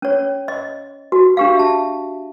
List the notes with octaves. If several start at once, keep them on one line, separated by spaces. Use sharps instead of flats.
C#4 C#5
D#5
F#4
D4 G4 F5
E5 A5